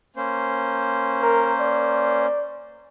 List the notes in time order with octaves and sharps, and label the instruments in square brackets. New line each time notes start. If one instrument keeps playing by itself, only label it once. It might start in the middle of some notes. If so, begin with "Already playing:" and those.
[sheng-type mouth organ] A#3 C#4 C5
[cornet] A#4
D5